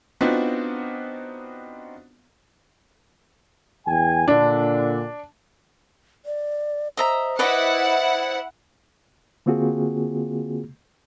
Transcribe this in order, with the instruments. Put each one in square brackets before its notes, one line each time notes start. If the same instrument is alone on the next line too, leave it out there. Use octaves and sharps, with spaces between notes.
[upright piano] B3 C4 D4 D#4 F4 F#4
[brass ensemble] E2 G5 G#5
[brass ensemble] A#2 D3 [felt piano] D4
[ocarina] D5
[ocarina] C5 [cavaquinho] D#5 E5 A#5
[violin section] E4 F#5 [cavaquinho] B4 D5 D#5
[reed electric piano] D3 A#3 C4 F4 F#4 G#4